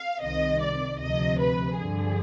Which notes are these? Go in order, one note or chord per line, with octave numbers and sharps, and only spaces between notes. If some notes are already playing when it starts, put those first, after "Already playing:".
Already playing: F5
C2 C3 D#3 D#5
D5
D2 C3 F3 D#5
B4
G2 D3 F3 G#4